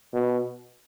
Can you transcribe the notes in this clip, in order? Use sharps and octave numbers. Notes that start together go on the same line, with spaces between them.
B2